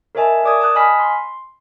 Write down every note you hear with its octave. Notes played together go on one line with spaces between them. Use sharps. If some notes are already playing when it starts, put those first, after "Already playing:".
A#4 C#5 D#5 E5 G#5 A5
A#4 D5 D6 D#6 G#6
A5 D#6 F#6
D#5 G#5 B5 F6 B6
C6